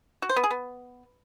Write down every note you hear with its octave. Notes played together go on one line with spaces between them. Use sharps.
F#4
C5
B3
G#4
B3